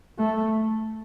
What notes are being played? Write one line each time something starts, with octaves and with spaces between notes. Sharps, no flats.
A3